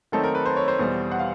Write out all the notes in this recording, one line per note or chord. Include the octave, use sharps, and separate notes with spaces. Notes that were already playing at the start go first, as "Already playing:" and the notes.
D#3 F#3 A3 C4 D#4 A4
A#4
B4
C5
C#5
C5
E2 B2 G3
F#5
F5